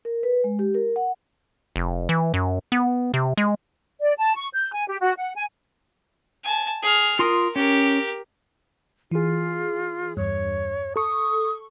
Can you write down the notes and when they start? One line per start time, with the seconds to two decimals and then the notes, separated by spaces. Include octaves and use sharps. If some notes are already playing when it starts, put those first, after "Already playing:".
0.05 A#4
0.23 B4
0.44 G#3
0.59 G4
0.74 A#4
0.96 F#5
1.76 F1
2.09 E3
2.34 F#2
2.72 B3
3.14 C3
3.37 G#3
4.00 D5
4.17 A5
4.35 C#6
4.54 G6
4.73 G#5
4.88 G4
5.00 F#4
5.17 F#5
5.35 G#5
6.44 G#5 A5
6.83 G#4 F6
7.19 F4 A#4 C6 D#6
7.56 C#4 G4 A#4
9.11 E3 F4 G#4
10.17 E2 G2 C#5
10.96 A4 C#6 D#6